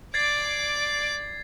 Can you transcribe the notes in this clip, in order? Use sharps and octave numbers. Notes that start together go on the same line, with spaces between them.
D5 D6 G#6 A6 C7